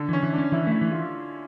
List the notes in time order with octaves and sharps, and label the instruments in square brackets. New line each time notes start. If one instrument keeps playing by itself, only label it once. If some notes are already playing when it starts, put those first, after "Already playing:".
Already playing: [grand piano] D3
[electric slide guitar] E3 [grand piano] C#4
[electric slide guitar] E3
[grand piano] D4
[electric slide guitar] C#4
[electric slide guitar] E3 [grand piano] E4
[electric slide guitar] A3 [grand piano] E4
[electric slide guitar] E3
[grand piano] F4